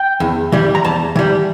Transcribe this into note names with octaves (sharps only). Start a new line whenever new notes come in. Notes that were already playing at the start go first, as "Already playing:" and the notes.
Already playing: G5
E2
E3 G3
A#5
E2 A5
E3 G3